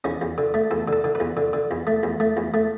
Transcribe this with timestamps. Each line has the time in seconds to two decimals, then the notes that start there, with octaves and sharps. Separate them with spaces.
0.04 E2 C#4
0.21 E2
0.38 D3
0.54 A3
0.71 E2 A4
0.88 D3 A4
1.04 D3
1.15 B4
1.20 E2
1.37 D3
1.53 D3
1.71 E2
1.87 A3
2.03 E2
2.20 A3
2.37 E2
2.54 A3